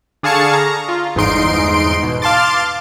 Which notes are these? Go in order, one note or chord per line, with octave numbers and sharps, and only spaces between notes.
D3 G#4 F5 A5 C#6 C#7
A#5
F4
G1 E2 G#2 D#4 C6 D7
B2
F5 A5 C6 D6 A6